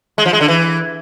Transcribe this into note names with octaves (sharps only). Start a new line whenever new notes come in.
G#3
F3
G#3
D3
E3